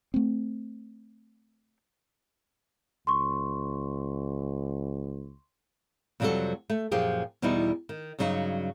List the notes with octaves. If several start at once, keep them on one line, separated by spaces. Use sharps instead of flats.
A3 C4
C#2 C6 C#6
F2 C3 F#3 G3 F#4 A4
A3
F#2 A#2 F3 G4 G#4
E2 B2 G3 B3 D#4 E4
D#3
G2 C#3 F#3 D#4 F#4